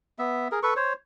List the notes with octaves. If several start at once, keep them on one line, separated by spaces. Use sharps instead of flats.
B3 E5
G#4 A#4
A4 B4 C#6
C5 C#5